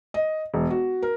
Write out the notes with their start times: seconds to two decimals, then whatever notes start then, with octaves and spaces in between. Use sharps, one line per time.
0.14 D#5
0.54 E1
0.70 F#4
1.02 A#4